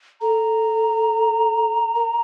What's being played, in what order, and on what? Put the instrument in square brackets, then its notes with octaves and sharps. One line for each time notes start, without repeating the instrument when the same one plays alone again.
[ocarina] A4 [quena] A#5
[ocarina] A#4